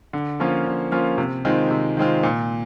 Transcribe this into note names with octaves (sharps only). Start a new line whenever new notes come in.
D3
F3 A#3 C#4 F4
D3
F3 A#3 C#4 F4
C3
D#3 G#3 C4 F4
C3
D#3 G#3 C4 F4
A#2